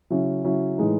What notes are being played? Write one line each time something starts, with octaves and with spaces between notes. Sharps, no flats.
C#3 F#3 C#4 E4
C#3 F#3 C#4 E4
A2 E3 G#3 D#4